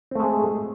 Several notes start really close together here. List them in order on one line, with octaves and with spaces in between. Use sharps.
C4 A3 G#3 G#4